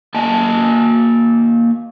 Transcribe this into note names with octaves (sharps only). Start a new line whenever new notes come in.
A#3 D#5 G#5 A5